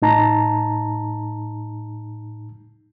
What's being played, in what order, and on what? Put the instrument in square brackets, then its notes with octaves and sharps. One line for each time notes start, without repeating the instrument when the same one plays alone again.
[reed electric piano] A2 D#4 A5 A#5